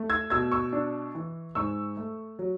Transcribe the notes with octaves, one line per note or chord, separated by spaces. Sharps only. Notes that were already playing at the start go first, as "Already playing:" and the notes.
Already playing: A3
E6 G#6
B2 E6 G#6
C#6 E6
D4
E3
G#2 C#6 E6
A3
F#3